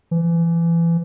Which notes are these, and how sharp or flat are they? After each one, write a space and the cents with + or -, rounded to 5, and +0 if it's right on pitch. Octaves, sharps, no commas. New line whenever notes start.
E3 +30